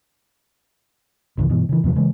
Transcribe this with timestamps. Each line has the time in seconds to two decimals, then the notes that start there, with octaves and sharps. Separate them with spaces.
1.38 C2 G2 C#3 E3
1.50 G2 B2 E3
1.69 C#3 E3
1.84 E2 C3 F3 F#3
1.96 C#3 E3 G#3